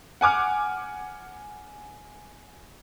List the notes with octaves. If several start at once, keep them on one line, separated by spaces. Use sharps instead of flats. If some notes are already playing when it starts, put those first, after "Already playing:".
F#5 G#5 D6 F6